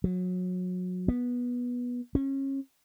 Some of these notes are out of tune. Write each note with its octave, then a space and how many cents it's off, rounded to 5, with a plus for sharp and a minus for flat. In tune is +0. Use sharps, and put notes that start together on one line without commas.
F#3 -30
B3 -15
C#4 -30